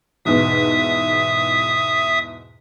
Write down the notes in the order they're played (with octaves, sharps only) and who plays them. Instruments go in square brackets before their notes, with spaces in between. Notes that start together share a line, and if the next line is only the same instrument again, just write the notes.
[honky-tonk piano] E2 G#2 B2 [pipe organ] E5 D#6